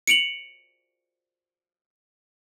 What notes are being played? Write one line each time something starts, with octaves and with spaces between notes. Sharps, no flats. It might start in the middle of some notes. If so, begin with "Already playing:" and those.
C#7 D7 F7 F#7